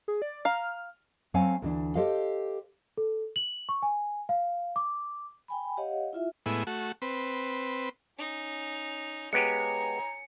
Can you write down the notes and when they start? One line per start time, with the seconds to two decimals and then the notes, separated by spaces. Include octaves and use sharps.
0.08 G#4
0.22 D5
0.45 F5 A#5 F6
1.34 F#3 A3 C4 C#5 F5 G#5
1.62 D2 E3 D4
1.95 G4 A4 C5 D#5 F5
2.97 A4
3.36 F#7
3.69 C#6
3.83 G#5
4.29 F5
4.76 D6
5.48 G5 G#5 B5
5.77 G4 C#5 D#5 F5 F#5
6.13 E4 F4 E5
6.46 A2 G#3 B3 E4
6.67 A3 F#4
7.02 C4 B4
8.18 C#4 D#4
9.33 G#3 B3 G4 C#5 G#5 A#5 C#7